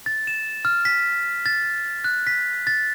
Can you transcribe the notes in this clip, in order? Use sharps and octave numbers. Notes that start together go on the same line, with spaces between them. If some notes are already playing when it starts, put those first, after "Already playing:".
A6
E7
F6
B6
A6
F#6
B6
A6